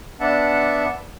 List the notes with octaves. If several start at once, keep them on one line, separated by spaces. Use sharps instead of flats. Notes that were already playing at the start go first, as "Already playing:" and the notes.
B3 D4 E5 F#5 A5